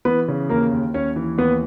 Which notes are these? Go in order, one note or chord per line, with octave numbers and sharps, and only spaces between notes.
E3 B3 B4
C#3
D#2 A#3 A#4
D#2
D#2 C#4 C#5
E3
D#2 B3 B4